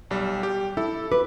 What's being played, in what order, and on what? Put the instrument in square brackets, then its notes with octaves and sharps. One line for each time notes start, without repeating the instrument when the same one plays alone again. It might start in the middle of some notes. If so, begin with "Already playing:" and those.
[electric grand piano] B1 G3
G4
[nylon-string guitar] E4 [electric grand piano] A4
[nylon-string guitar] B4 [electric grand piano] D6